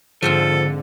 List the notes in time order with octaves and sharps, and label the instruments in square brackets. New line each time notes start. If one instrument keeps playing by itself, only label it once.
[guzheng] G#2 C4 F4 [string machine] D3 [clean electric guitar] F3 [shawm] A4